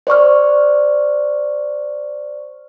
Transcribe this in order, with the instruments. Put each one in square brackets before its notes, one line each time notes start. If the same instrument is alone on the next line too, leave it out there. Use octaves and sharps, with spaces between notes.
[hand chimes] C5 D5 C#6 F6